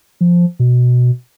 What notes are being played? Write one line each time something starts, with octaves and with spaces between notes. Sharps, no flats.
F3
B2